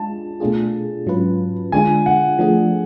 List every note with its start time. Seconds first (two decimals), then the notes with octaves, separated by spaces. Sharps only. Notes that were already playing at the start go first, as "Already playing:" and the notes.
Already playing: G#3 D4 F4 A5
0.40 B2 A3 D4 F4 G#4
1.06 G#2 F#3 C#4 F4 B4
1.72 D3 G#3 D4 F4 G#5
2.06 F#5
2.39 F3 A3 D4 G#4